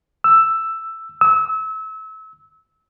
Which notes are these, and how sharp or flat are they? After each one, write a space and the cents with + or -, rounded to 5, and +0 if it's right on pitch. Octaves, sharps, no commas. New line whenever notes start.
E6 +5
E6 -30